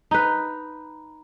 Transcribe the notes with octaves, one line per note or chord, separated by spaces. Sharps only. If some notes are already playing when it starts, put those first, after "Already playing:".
D#4 B4